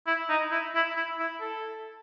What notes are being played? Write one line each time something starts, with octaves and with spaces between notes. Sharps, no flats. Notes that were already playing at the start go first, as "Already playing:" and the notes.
E4
D#4
E4
E4
E4
E4
A4